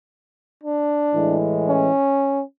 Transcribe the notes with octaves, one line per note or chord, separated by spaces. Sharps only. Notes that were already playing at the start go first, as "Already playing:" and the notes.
D4
A2 E3 G#3
C#4